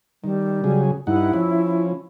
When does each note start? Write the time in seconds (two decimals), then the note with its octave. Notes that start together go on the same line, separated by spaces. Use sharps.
0.24 D#3 G3
0.64 C#3 F#3 G#4
1.07 G2 D#4 E4 F#5
1.33 F3 C#4